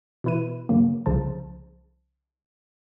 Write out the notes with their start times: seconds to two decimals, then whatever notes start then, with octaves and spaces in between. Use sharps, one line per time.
0.24 B2 E3 E4 B4 D#7
0.69 G2 C#3 F#3 A#3
1.06 C2 C#3 F3 C5 A5